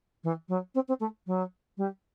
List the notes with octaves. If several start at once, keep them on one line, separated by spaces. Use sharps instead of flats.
E3
F#3
C4
C4
A3
F#3
G3